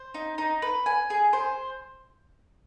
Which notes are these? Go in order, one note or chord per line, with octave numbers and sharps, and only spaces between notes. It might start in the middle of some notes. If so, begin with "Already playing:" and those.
Already playing: C5
D#4
D#4
B4
G#5
G#4
C5